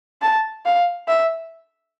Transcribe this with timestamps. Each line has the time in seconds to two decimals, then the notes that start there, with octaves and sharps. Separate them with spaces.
0.22 A5
0.65 F5
1.08 E5